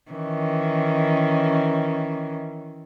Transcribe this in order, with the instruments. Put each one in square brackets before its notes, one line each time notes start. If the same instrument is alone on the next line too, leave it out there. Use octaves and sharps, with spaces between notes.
[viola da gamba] D#3 E3 C#4